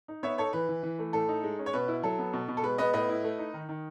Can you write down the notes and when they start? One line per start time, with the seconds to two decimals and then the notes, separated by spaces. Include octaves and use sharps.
0.08 D#4
0.23 B3 C#5 E5
0.38 D#4 A4 C#5
0.53 E3 B4
0.69 E3
0.83 E3
0.99 A3
1.13 A2 A4
1.29 D#4
1.44 G#3
1.59 C#4
1.66 C#5
1.73 B2 B4
1.88 E4
2.03 F#3 A4
2.19 B3
2.33 B2
2.48 B2
2.57 A4
2.63 G#3 B4
2.78 B3 B4 D#5
2.93 A2 B4 D#5
3.09 E4
3.24 A3
3.39 D#4
3.54 D#3
3.69 D#3